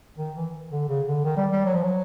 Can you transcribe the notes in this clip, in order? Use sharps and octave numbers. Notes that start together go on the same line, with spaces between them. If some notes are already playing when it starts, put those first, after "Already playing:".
D#3
E3
D3
C#3
D3
D#3
G3
G3
F#3
F3
F#3